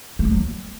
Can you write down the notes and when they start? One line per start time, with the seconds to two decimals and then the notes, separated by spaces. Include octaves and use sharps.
0.19 A3
0.25 E3
0.31 F#3
0.36 B3